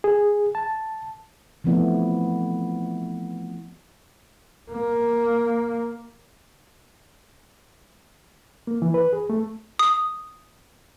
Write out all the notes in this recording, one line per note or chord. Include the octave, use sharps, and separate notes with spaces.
G#4
A5
E3 F3 A3 B3 C4 E4
A#3
A#3
E3
B4
G#4
A3
D#6